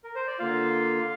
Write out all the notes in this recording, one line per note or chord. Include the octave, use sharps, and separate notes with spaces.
A#4
C5
D5
D3 A#3 F4 F5